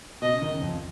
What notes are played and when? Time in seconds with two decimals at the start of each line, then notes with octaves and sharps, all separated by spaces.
0.22 B2 D#5
0.32 C#3
0.42 D#3
0.51 C#3
0.62 F2